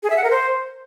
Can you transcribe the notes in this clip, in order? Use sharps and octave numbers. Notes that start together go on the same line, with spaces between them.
G#4
E5
F#5
A#4
C5